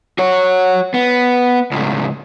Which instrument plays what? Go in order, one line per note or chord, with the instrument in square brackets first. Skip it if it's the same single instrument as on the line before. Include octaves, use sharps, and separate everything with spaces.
[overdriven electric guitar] F#4 C#5
B3
C#2 A2